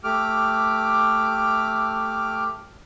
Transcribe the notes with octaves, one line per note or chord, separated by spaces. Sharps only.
A3 G4 D6 F6